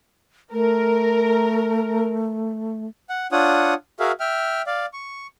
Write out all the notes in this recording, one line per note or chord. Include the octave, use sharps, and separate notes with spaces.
A3 A#4
F#5
D4 F4 C#5 F#5 D#6
F#4 G#4 A#4 E5 F5
E5 G5 F6
D5 F5
C#6